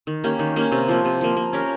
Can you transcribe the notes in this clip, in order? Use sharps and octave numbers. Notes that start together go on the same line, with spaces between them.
D#3
A#3 C#4 G4
D#3
A#3 C#4 G4
C3
F3 A#3
C3
F3 A#3
A#3
C#4 G4 A#4